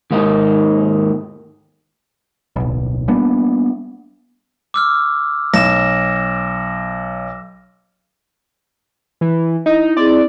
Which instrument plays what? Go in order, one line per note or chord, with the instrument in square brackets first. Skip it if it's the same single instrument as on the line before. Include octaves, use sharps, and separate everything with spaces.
[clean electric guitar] D#2 G#2 A#3 D#4
[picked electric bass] D1 B1
G3 A#3 B3 D4
[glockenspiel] D6 E6 F6
[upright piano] B1 [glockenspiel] A#6 E7
[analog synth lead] E3
[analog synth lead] D#4 [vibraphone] E4
[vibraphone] C4 E4 G#4 [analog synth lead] D5